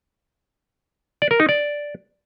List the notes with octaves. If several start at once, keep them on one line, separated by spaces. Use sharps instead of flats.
D5
A#4
D#4
D5